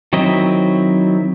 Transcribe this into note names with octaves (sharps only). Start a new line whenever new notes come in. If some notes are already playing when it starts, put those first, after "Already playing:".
D#3 F#3 C4 E4 D#5